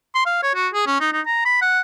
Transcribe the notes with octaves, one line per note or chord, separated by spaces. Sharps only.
C6
F5
C#5
F#4
G#4
C#4
D#4
D#4
A#5
B5
F#5